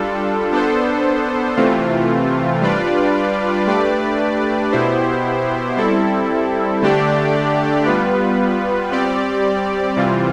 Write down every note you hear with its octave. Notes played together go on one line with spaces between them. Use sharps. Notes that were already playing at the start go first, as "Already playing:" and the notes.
Already playing: G3 D4 F4 A4
B3 D4 A4 C5
C3 E3 A3 C4 F4
G3 D4 F4 B4 D5
A3 D4 G4 B4 D5
B2 B3 E4 G4 C5
G3 C4 E4 A4
D3 A3 D4 G4 D5
G3 B3 F4 B4
G3 C4 G4 D5
C3 E3 G3 C4 F4